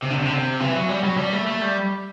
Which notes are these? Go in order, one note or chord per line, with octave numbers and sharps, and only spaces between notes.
C3
D3
C3
D3
C3
E3
F#3
G3
F#3
G3
A3
A3
G3